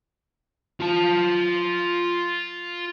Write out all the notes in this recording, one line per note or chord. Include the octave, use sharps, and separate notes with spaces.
F4 A5